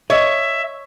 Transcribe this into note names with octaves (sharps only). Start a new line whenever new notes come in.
C#5 D#5 E5